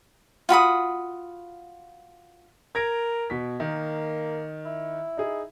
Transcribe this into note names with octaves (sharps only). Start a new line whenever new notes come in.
F4 F#4 B5 D#6
A#4 G#6 A#6 D7
B2 B6
D#3 A#3
E4
D#4 G#4